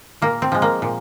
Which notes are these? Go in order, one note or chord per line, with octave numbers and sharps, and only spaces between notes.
A#2 A#3
C4
F3 G#3
A#3
A#2